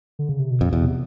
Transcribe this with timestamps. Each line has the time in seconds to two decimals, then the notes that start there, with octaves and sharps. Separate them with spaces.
0.19 D3
0.29 C#3
0.39 C3
0.51 B2
0.61 F2 A#2
0.73 E2 B2
0.83 C3